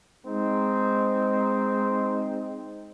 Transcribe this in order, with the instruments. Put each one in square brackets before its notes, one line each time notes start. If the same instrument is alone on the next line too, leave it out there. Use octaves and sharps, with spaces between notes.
[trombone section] G#3 C4 D#4